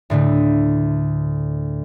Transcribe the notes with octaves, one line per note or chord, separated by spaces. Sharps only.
D2 A2 D3 A3